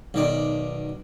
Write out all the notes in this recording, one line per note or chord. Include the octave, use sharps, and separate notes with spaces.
B1 D#3 D5